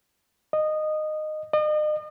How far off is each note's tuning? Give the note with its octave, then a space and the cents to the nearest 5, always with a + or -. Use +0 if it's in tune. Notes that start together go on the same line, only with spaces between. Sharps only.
D#5 -15
D#5 -40